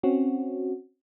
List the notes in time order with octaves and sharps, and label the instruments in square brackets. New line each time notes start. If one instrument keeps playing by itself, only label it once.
[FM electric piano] C4 C#4 F#4